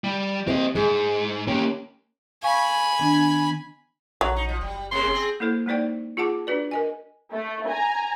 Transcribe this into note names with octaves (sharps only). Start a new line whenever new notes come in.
G3
C4 G4 D#5
G#2 G#3
A#3 C#4 G4
F5 G#5 B5 C#6
D#3 B3 D4
A#1 F#3
D#4
F3
F#1 G3
C3 G#3 A#3 C6
C4 G#4
A#3 E4 A4 C5
G#3 A#3 D#4 C5 D5 G5
F4 G#4 F#5 A5 D6
D4 F#4 B4 D5
A#4 D#5 G#5
A3
G#5 A#5